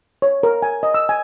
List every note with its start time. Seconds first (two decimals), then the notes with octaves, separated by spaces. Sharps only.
0.22 C#5
0.43 A#4
0.62 G#5
0.83 D#5
0.94 E6
1.09 G#5